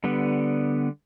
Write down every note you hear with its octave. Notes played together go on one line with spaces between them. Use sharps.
D3 G3 B3